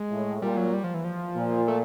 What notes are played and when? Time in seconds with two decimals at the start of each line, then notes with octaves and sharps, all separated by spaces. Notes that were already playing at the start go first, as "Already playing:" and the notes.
Already playing: G#3
0.11 A2
0.42 A#2 G3
0.57 F#3
0.74 G3
0.84 F3
0.94 E3
1.04 F3
1.36 A#2
1.68 A3